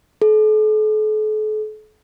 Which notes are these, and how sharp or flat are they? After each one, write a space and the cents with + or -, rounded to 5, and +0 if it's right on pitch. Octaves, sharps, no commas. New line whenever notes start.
A4 -40